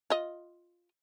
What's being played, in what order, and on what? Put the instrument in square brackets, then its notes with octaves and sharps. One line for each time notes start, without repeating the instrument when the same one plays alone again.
[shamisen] F4 D#5